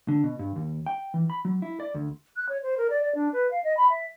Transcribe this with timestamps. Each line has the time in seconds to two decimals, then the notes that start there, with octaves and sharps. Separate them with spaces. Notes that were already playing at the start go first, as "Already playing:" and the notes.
0.08 D3
0.24 B2
0.39 G2
0.56 D#2
0.86 G5
1.14 E3
1.30 B5
1.45 F#3
1.62 E4
1.80 D5
1.94 D2
2.36 F#6
2.49 C#5
2.63 C5
2.78 A#4
2.90 D5
3.02 D5
3.15 D4
3.33 B4
3.51 F5
3.64 D#5
3.77 B5
3.90 E5